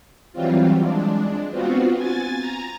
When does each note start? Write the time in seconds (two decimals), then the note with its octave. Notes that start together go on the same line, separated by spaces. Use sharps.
0.33 E3 F#3 G3 C4 F4
0.83 G#3 D4
1.51 B3 C4 F4 F#4
1.97 G#5 A6
2.38 A#5